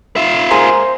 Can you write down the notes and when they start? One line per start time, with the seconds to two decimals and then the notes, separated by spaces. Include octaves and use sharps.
0.16 F4 E5
0.50 G#2 A#3 G#4 C5